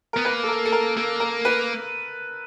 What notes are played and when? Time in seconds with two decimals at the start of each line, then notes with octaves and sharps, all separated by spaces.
0.13 B3 A#4
0.25 A#3 B4
0.43 A4
0.48 A#4
0.65 A4
0.72 A#4
0.96 A#3 A4
1.20 A#4
1.45 B4